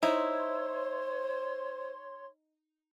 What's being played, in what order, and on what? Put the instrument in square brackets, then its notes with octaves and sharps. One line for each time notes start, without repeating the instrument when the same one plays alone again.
[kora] D#4 [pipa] E4 [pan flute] C5 [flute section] C#5 C6